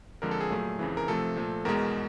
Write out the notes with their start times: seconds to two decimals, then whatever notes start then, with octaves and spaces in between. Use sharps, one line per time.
0.22 F2 D3 F3 G#3 A#4
0.31 A4
0.40 G#4
0.50 A#2 F#3 A3
0.79 F2 C#3 E3
0.97 A#4
1.08 C3 F3 A3 A4
1.36 A#2 F3 A3
1.65 E2 B2 G#3 A#4